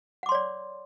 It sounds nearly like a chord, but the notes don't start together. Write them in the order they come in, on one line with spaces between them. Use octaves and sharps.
F#5 D6 C6 C#5 D5